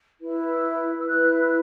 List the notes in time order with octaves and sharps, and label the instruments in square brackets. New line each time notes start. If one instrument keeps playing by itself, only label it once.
[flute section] E4 B4
E6
E4 B4 F#6